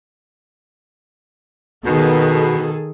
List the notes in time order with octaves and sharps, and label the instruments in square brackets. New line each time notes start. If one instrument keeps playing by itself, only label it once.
[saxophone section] B2 [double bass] D#3 [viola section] G#4 A4